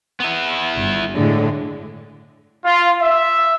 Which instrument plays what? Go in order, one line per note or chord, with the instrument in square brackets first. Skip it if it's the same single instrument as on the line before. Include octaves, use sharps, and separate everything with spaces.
[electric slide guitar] B3 E4
[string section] G1
A2 D3 G#3
[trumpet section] F4
E5